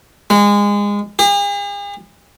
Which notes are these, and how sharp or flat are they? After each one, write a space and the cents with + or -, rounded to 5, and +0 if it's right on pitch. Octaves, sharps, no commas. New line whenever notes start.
G#3 -25
G#4 -45